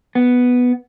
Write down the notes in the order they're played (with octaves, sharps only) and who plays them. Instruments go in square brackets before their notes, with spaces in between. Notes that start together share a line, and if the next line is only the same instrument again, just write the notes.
[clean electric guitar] B3